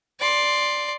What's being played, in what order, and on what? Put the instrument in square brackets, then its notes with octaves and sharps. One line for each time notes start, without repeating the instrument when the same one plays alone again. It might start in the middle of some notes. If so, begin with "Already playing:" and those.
[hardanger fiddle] D5 C6